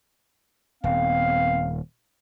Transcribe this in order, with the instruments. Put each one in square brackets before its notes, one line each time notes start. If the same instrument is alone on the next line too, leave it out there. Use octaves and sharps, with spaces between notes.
[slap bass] D#1 [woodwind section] B3 C4 F5